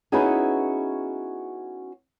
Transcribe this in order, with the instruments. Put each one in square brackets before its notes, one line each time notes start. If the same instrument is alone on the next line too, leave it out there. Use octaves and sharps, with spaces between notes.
[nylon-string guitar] B3 C#4 D#4 E4 F#4 G#4